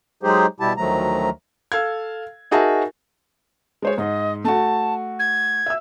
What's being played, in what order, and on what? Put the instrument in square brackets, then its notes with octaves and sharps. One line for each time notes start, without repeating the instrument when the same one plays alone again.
[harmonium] F#3 G#3 D#4 G4 G#4 C5
B2 G3 E4 G4 A5
D2 D#3 F3 F#3 A3 A#5
[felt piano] A4 F5 G#6
D#4 F#4 G#4 A#4 E5 A5
G#3 C5 C#5
[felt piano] G#2 [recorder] D#5
[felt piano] A3 F#4 [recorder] A5
[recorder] G#6
[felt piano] E5 E6